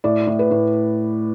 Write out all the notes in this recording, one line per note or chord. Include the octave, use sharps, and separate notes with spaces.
A2 D5
A2
B4
A2